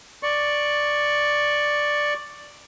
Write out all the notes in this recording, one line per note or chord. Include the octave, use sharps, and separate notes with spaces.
D5 C#6